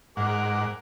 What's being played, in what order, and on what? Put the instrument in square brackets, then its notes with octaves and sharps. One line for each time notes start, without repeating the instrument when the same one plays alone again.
[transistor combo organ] G#2 F#5 [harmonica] G#4 A#4 D6